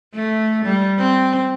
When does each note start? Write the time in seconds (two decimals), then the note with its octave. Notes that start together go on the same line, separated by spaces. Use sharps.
0.14 A3
0.65 G3
0.98 C4